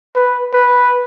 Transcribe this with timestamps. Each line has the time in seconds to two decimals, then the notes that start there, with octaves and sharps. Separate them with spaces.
0.16 B4
0.54 B4